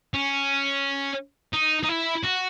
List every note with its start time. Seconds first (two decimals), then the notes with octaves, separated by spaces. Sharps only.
0.14 C#4
1.53 D#4
1.83 D#4
1.89 E4
2.23 F#4